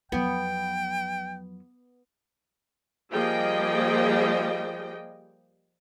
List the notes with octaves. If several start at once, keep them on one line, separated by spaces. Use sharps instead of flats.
F2 F#3 B3 G5
F3 G3 A#3 G#4 D#5 G5